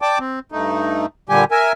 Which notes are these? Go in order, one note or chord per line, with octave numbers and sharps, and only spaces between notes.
D5 G5 A5 D6
C4
G2 A3 D#4
A#2 D3 G3 G4 G#5
A#4 E5 G#5